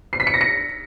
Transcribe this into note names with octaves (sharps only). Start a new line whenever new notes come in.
C7
B6
C#7
A#6
C#7